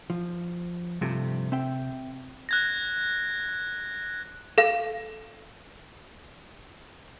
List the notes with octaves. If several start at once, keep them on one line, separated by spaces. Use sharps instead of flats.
F3
G2 C3 F3 A3
C4 E5 G5
F#6 G#6 A#6
A4 F5